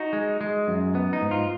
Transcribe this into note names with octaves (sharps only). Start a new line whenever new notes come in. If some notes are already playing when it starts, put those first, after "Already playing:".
Already playing: D#4 F#4
G#3
G#3
F#2
B3
D#4
G#2
F4